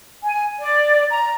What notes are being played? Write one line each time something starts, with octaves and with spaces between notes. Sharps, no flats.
G#5
D5
A#5